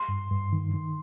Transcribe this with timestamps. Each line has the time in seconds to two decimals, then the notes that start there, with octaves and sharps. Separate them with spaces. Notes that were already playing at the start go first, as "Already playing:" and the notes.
Already playing: C6
0.09 G2
0.31 G2
0.53 D#3
0.74 D#3